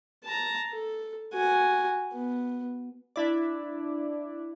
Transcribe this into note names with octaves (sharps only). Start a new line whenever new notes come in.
A5 A#5
A4
F#4 G#5
B3
D4 E4 D5